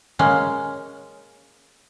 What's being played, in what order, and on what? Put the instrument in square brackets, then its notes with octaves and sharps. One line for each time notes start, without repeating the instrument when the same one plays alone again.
[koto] G#3 A#3 C#4